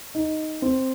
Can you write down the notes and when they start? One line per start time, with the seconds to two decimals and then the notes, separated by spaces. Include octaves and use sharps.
0.15 D#4
0.62 C4